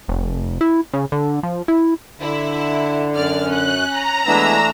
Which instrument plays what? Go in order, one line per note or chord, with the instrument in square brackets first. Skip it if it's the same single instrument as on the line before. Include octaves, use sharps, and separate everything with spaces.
[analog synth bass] F1
E4
C#3
D3
F3
E4
[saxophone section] D3 [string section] E4
[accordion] F#2 [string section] D5 F6
[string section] C#4 [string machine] F#6
[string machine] A#5
[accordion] E3 A3 D4 [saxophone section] G#3 B3 E4 [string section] E6 A#6